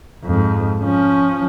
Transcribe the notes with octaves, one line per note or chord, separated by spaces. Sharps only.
F2 G#2
F3 C#4